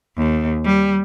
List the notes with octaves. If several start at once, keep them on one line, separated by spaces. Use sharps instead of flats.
D#2
G3